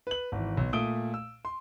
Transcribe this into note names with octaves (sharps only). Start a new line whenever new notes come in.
B4 F#7
G#1 E3
B1
A#2 A3 D#6 D7 G7
E6
C6